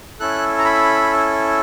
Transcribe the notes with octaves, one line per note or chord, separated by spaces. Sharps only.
C#4 E4 A4 F#6
A#5
B5